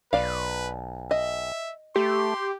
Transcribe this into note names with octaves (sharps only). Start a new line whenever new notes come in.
B1 B4 D5 F5
D#5 E5
A3 G4 C6